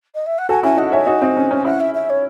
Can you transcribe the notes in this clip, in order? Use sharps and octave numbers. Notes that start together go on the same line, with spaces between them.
D#5
E5
F#5
F#4 A4 G#5
C#4 E4 G#5
D#4 F#4 F#5
C#5 E5 G#5
D#4 F#4
C4 D#4
C#4
C#4
C#4 E4 F#5
E5
E5
C#5